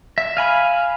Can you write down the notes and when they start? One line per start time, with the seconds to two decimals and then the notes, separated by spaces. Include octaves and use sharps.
0.18 E5
0.37 F5 G#5 B5